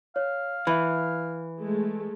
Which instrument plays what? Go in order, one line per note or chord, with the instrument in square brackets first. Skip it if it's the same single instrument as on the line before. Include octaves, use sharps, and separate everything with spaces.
[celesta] C#5 [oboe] F5
[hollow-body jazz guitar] E3 [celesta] E5 B5
[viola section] G#3 A3